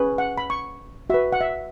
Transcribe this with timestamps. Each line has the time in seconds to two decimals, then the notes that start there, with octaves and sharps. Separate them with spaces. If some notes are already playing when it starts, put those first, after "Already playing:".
Already playing: C#4 G#4 B4
0.18 F#5
0.38 B5
0.50 C#6
1.10 F#4 B4 E5
1.33 F#5
1.41 E5